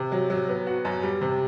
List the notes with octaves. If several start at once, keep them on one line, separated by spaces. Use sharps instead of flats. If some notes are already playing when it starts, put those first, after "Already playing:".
Already playing: C3
F#3
F#3
B3
F#4
F#2
G3
C3